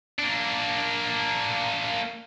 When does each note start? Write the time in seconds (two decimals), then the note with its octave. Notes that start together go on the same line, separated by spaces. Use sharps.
0.19 A#3 D4